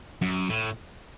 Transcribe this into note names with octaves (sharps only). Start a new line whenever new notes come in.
F#2
A2